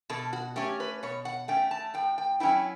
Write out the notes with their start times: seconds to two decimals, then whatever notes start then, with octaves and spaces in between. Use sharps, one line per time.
0.10 B2 A4
0.33 F#4
0.56 A3 C#4 G4
0.80 B4
1.03 B2 C#5
1.25 F#5
1.48 A3 C#4 G5
1.71 A5
1.94 A2 G5
2.18 G5
2.40 F#3 C#4 E4 G5